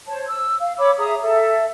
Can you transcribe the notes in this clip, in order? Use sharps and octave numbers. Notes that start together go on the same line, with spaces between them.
C5 C#5 A5
E6
F5
C#5 B5 D6 E6
G#4 E5 A#5 D#6
A4 E5